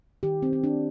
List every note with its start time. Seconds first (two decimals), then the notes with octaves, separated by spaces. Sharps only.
0.23 D#3 G4
0.43 C4
0.53 C4
0.64 D4